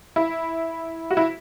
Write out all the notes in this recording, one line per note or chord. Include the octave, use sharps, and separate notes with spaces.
E4
F#4
E4